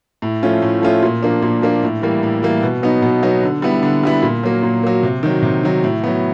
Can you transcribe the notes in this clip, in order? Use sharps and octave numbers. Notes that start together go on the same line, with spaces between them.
A2
F3 A3 C#4 F4
A2
F3 A3 C#4 F4
A#2
F3 A#3 D4
A#2
F3 A#3 D4
A2
E3 G3 A#3
A2
E3 G3 A#3
B2
F#3 B3 D#4
B2
F#3 B3 D#4
D3
G3 B3 E4
D3
G3 B3 E4
A#2
F#3 A#3
A#2
F#3 A#3
C3
D#3 F#3
C3
D#3 F#3
A2
F#3 B3